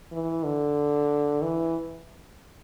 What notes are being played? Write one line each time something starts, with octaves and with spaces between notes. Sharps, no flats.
E3
D3
E3